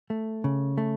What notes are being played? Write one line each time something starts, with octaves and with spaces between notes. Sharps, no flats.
A3
C#3
A3